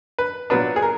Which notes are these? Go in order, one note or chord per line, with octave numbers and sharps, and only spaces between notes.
B4
A#2 F#3 B3 D4 B4
G#4
A#4